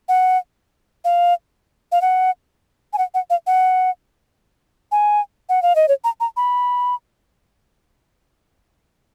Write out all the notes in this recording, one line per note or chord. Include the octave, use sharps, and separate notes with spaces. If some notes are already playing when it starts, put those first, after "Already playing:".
F#5
F5
F5
F#5
G#5
F#5
F#5
F5
F#5
G#5
F#5
F5
D#5
C#5
A#5
A#5
B5